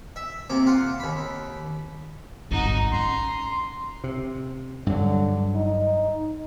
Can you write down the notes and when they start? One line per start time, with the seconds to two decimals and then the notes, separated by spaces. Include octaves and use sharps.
0.16 E5
0.50 C3 A#3 D6
0.67 F4 F5 F#5
1.00 D#2 B5
2.51 G#1 G2 D#4 F#4
2.92 C#4 A#5 C6
4.04 C3
4.87 G2 D3 F#3
5.55 D#4